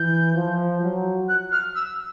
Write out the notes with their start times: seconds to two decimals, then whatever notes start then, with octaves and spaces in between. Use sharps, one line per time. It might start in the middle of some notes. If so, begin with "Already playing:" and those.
Already playing: E3 G6
0.35 F3
0.82 F#3
1.29 F#6
1.52 F6
1.76 E6